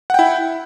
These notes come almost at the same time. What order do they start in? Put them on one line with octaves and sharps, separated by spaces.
F#5 G5 E4